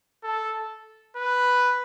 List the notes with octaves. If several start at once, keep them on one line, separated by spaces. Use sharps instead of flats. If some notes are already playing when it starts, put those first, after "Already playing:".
A4
B4